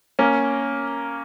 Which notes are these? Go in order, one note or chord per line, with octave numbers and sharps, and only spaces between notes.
A#3 C#4